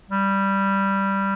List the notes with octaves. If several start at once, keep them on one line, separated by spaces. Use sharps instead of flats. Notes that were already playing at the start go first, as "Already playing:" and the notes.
G3